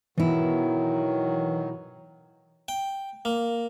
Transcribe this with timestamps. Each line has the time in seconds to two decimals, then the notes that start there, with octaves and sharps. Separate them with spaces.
0.18 B2 D#3 E3 F#3 E4
2.68 G5
3.25 A#3